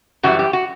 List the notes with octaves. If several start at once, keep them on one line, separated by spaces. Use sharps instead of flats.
F#2 E3 G3 F#4
G4
F#4